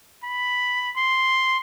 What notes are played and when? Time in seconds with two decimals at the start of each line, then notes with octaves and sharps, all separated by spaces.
0.23 B5
0.96 C6